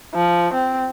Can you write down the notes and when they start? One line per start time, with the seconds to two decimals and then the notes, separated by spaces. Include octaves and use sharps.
0.14 F3
0.54 C4